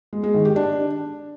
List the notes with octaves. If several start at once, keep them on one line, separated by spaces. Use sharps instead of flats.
G#3
G#3
D#3
G4
D4